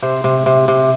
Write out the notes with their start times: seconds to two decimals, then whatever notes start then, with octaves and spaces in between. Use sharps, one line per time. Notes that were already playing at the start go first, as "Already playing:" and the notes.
0.02 C3 C5
0.24 C3
0.46 C3
0.68 C3